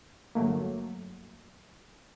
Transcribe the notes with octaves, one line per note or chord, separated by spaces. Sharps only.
G1 F#3 A3 A#3